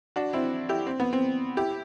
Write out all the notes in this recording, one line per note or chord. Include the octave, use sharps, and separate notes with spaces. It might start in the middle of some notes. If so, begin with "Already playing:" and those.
D4 F#4
C4 E4
E4 G4
C4
B3
C4
E4 G4